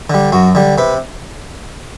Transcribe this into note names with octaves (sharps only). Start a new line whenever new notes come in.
D3 G3
F#2 F#4
D3 G3
C3 B4